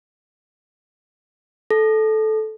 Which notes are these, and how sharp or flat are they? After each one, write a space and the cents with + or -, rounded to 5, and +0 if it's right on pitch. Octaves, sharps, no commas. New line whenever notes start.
A4 -15